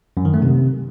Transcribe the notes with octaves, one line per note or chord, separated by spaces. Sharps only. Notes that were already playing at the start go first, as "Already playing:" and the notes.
F#2
D#3
A3
C3